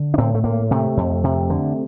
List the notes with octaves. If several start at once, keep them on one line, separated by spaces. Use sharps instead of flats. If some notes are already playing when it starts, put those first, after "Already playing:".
Already playing: D3
D4
A2 C4
A3
A2 A#3
C3 A3
F2
C3
D3